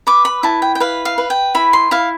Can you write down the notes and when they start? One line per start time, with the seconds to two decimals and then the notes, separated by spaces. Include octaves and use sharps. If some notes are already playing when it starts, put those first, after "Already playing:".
0.07 B4 D6
0.25 B5
0.43 E4 A5
0.62 G5
0.75 G5
0.80 B4 F5
1.05 F5
1.18 B4
1.30 G5
1.55 E4 B5
1.73 C6
1.91 E4 F5